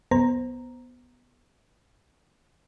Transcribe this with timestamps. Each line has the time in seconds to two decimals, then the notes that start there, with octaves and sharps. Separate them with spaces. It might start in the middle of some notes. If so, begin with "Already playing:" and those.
0.11 C2 F#2 B3 C5 A#5